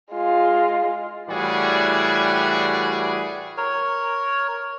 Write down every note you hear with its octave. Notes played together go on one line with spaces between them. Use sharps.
G#3 F4
A2 E3 G3 F#4 G#4 D5
A#4 C#5